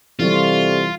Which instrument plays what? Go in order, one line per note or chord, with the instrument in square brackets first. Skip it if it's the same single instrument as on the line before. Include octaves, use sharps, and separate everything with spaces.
[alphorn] C3 [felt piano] E3 G3 [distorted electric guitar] F4 [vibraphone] A4 D5 C#6